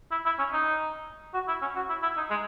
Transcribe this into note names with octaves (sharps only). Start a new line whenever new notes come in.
E4
E4
C#4
D#4
F#4
E4
C#4
F#4
E4
E4
D#4
G#3